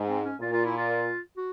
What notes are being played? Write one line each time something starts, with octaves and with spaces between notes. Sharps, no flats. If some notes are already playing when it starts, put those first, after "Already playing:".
Already playing: G#2
C4
C#4
A#2 F4
F4
E4
F4
F#4